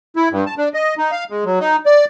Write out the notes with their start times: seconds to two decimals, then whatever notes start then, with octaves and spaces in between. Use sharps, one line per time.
0.16 E4
0.31 G2
0.46 A5
0.58 D4
0.74 D#5
0.98 D#4
1.11 F5
1.30 G#3
1.45 F#3
1.60 D#4
1.86 D5